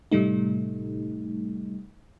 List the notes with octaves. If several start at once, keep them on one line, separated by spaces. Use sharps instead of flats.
A2 C3 G3 A3 D#4